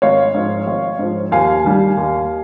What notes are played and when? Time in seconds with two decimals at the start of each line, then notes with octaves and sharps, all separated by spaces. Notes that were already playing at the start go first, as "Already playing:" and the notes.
0.02 G#1 C#5 F5
0.35 G#2 F3
0.67 G#1
0.99 G#2 F3
1.31 D#2 F5 G#5
1.65 D#3 G3
1.97 D#2